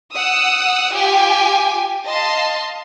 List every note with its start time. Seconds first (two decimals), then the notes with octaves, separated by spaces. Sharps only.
0.14 F#5 D#6 E6
0.93 F4 G4 G5 G#5
2.07 D#5 F5 A5 C6